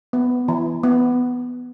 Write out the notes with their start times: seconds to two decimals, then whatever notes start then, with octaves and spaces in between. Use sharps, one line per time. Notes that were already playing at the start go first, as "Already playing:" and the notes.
0.13 B3
0.48 E3
0.83 B3